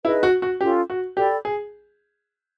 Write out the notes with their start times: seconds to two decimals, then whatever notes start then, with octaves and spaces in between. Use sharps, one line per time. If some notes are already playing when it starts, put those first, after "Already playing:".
0.05 D#4 E4 G#4 B4 D#5
0.23 F#4
0.42 F#4
0.61 C#4 F4 G4 A4
0.90 F#4
1.17 G4 A4 D5 G5 B5
1.45 G#4